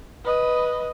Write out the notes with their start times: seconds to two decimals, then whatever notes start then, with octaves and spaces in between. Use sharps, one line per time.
0.24 B4 D#5